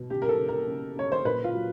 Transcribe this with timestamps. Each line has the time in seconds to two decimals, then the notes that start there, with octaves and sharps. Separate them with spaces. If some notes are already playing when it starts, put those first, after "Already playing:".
Already playing: B2
0.10 C#3 G4
0.22 A#4
0.29 A4
0.38 C#3
0.49 A#4
0.67 C#3
0.96 C#3 C#5
1.12 C5
1.25 A#2 B4
1.44 F4
1.53 F#3